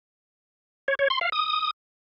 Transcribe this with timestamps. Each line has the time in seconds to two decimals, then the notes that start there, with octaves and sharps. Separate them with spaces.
0.88 C#5
0.99 C#5
1.10 C6
1.21 F5
1.32 D#6